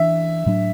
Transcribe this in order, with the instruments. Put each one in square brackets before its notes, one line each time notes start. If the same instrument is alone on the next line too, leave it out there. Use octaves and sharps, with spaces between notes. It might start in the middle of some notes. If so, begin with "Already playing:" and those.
Already playing: [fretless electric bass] E3 D4 [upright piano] E5
[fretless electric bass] A2 F#3 D4